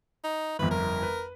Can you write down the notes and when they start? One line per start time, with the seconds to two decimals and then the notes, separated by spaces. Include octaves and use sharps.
0.24 D#4
0.59 G1 F2 B4
0.71 A#4
1.03 B4